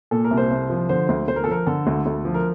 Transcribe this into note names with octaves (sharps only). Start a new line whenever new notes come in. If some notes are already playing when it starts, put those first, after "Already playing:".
A#2 A4
A#4
C2
C5
C2
F3
D3 C5
D2
D2 C5
A#4
A4
F3 A#4
D3 A4
D2
D2
F3
A#4